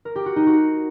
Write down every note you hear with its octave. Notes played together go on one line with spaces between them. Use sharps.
A#4
G4
F#4
D#4
F#4